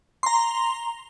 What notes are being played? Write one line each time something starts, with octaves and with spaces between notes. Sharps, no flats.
A#5 C6